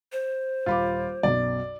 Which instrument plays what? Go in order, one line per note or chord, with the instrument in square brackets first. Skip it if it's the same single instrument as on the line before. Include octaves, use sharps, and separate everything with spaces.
[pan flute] C5
[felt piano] D#1 B5 D6 [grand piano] F4
[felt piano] B1 F#2 B2 [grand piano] D5